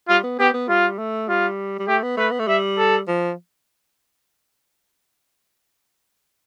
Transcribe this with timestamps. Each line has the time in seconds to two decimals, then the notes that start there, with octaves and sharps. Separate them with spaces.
0.08 G3 F4
0.23 B3
0.39 B3 G4
0.54 B3
0.69 G3 F4
0.98 A3
1.28 G3 F4
1.79 G3
1.88 A3 G4
2.03 B3
2.17 A3 B4
2.31 B3
2.39 A3
2.47 G3 E5
2.78 A4
3.08 F3